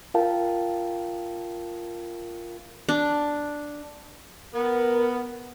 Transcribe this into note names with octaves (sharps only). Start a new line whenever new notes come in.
F4 A#4 F5 G5 A5
D4
B3 A#4